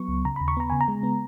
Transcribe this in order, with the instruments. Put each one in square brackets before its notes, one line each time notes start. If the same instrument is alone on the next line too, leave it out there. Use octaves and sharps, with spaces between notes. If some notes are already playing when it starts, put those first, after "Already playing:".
Already playing: [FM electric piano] F#3 B3 C#6
C#2
C#3 A#5
D#2 B5
C#6
B3 A#5
C#3 G#5
A#5
G#3
B3